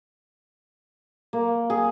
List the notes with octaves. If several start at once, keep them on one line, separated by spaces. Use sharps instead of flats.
A#3
G#4